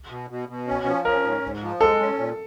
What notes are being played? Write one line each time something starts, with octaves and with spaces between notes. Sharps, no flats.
B2
B2
B2
C#4
F3
C#4 A#4
G#2
G#2
F3
G#3 A4
C#4
A#2